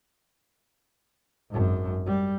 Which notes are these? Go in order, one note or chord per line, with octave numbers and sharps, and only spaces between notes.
G#1 F#2
G3